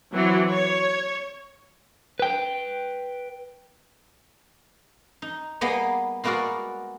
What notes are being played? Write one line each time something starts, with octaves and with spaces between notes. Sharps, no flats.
E3 F#3 C4
C#5
B4 G5
D#4
G3 A#3 B3 G#4 D#5
G#3 A#3 B3 F#4 A#4 D5